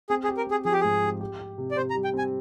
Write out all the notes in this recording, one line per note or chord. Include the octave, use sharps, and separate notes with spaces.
C4 G#4
G#4
G4
A#4
C4 G#4
F3 G#4
G4
G#2 G#4
G4
G4
G4
C3
D5
C3 C5
A#5
G3
G5
C4 G#5